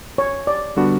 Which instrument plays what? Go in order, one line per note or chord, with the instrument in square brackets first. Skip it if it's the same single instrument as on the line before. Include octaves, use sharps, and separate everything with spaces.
[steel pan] C#5
D5
[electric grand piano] D3 G3 B3 D4 F#4